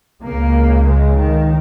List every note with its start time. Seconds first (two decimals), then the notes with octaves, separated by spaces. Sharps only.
0.24 C#2 C#3 A#3
0.87 G#3
1.18 D#3